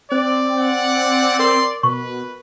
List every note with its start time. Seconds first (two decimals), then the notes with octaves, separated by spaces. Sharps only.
0.12 C4 C5 D5
0.59 F#5
1.39 A#4 C6
1.83 B2 B4 C#6